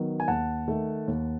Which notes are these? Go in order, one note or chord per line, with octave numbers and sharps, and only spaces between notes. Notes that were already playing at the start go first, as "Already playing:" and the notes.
Already playing: D#3 F#3 B3
G#5
D#2 F#5 A5
D#3 A3
D#2